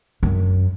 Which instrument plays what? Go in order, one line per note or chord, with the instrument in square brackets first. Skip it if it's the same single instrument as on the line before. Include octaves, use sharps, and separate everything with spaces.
[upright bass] F#2